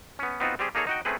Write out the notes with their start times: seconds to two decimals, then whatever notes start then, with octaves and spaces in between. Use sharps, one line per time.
0.19 B3 C#4
0.40 B3 C4 D#4 F4 F#4
0.59 G3 C4 G4 G#4
0.75 A#3 D#4 G#4 A4 C#5 A#5
0.87 D#4 F#4 G5
1.05 A3 C4 C#4 G#4 B4